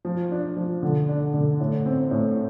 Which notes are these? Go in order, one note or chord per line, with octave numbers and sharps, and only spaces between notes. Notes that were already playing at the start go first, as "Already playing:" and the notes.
F3
D4
F3
D3
D4
D3
A2
C4
A2